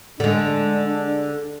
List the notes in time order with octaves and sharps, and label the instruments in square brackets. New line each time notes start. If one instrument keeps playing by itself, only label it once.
[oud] D3 G#3 [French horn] D4